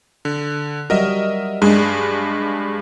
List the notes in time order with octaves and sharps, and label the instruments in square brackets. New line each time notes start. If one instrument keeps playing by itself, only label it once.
[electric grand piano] D3
[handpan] F#3 G3 F#4 [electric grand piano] A#4 D#5 E5
[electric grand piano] G2 D4 [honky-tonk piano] G#3